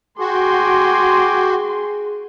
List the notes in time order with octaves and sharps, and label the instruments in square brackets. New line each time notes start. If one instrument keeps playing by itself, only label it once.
[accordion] F#4 [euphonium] G#4 [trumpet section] G5 G#5 D6 [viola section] C6